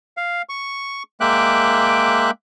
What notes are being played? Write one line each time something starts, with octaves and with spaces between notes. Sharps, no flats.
F5
C#6
G#3 A#3 E5 G5 D6 F#6